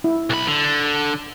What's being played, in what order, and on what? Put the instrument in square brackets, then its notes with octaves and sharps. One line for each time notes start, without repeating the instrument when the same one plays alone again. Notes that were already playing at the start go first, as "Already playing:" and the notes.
[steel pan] E4
[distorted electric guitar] B1 B5
D3